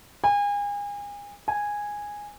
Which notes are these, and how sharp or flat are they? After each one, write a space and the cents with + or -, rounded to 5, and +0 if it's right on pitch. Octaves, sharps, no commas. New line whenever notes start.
G#5 -35
G#5 -10